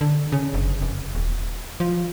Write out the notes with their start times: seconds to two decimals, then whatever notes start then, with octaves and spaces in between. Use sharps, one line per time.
0.01 D3
0.32 C#3
0.54 F#1
0.82 F1
1.15 D#1
1.80 F3